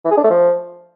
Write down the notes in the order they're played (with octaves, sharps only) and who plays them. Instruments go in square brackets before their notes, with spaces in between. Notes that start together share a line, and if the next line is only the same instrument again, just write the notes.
[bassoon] E3
G#4
D4
A3
F3